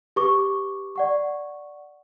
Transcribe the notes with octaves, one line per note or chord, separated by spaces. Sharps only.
G4 B4 C#6 D6
D5 F#5 C#6